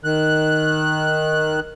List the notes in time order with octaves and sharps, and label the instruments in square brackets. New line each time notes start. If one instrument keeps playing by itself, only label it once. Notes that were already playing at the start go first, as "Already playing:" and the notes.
[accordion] D#3 F#6